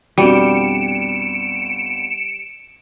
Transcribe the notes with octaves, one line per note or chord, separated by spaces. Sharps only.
B1 F2 G3 D4 F#4 C#7 D7 E7